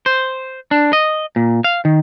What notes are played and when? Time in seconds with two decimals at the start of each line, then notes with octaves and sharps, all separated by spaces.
0.06 C5
0.71 D4
0.93 D#5
1.36 A#2
1.64 F5
1.85 D#3